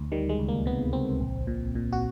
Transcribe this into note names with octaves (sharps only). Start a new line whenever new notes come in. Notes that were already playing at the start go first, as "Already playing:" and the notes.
Already playing: D2
D#3 G3
G#3
C#2
A#3
C3 B3
C#2 C4
A#1
A#2
A#2
F#4